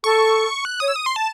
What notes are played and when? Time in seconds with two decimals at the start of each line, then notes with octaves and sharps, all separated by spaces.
0.04 A4 C#6
0.65 F#6
0.80 C#5 D#6
0.88 E6
0.96 D#6
1.06 C6
1.16 A5